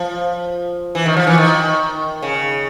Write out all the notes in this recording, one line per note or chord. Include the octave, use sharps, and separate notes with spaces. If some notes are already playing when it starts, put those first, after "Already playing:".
Already playing: F3
E3
D#3
F3
E3
D#3
C#3